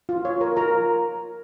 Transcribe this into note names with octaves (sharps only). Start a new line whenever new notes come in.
F4
C#5
A#4
F4 A#4 A#5